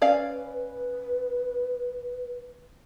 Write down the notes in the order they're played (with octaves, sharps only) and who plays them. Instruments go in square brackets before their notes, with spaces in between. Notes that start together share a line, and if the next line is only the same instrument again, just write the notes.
[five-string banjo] C#4 D5 F5 [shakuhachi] B4